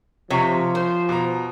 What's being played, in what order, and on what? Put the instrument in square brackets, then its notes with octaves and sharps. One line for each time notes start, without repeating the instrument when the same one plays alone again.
[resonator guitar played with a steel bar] C3 [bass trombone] F3 [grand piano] C#5 A#5 C#6
[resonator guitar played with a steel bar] C5
[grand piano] B2 A#5